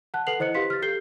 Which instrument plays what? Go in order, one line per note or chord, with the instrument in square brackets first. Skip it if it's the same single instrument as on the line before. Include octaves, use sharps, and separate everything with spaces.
[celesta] F#5 A5 F#6
A4 B4 F#5 C7 F7 F#7
E4 C5 D#5 F#6 C#7
G4 B4 F5 C6 B6
F6 A6
G4 A4 G6 C7 G7